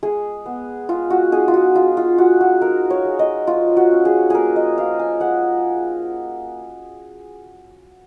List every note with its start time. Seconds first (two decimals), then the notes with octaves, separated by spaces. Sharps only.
0.03 G#3 G#4
0.46 B3
0.89 G#3 F4
1.10 F#4
1.32 D#4 G#4
1.48 F4
1.54 F#4
1.75 D#4 F4
1.97 F4
2.18 D#4 F#4
2.41 F#4
2.62 D#4 A#4
2.90 C#5
3.05 G#3
3.19 D#5
3.47 F3 F4
3.77 F#4
3.91 C#4
4.05 G#4
4.30 A#3 G#4 A#4
4.56 D#5
4.77 F3 F5
4.99 G#5
5.20 G#3 F#5